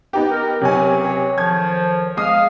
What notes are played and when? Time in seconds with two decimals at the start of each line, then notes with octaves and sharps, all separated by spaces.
0.13 B3 D#4 G4
0.31 A#4
0.61 C#2 C3 F#3 C#5 G#5
1.38 A2 D#3 F3 G#6
2.17 G#3 F5 D#6